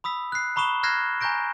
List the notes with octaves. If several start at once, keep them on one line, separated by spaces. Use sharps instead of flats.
B5 D#6 E6 B6
F#6 C7
A#5 B5 C#6 D#6 E7 G7
F6 F#6 G#6 A#6 C7 E7
G#5 A#5 C#6 G6 A#6 D7